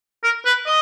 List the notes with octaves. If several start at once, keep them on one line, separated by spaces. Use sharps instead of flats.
A#4
B4
D#5